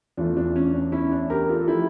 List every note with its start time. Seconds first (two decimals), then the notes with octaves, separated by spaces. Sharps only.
0.17 E2 E3 A3 D4 F4
0.37 D4 F4
0.56 C#4
0.73 D4
0.92 C#4 E4
1.12 D4
1.30 G4 A#4
1.49 F4 A4
1.61 A4
1.68 F3 A3 E4 G4